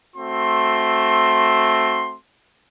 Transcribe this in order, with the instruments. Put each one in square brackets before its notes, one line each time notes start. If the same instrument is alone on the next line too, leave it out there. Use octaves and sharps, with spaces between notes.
[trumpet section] A3 C4 F#4 C6